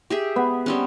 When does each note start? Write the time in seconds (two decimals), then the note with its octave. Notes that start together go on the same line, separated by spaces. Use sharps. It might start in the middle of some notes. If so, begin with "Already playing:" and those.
0.10 G4 G#4 E5
0.36 B3
0.66 G3 C4 C#4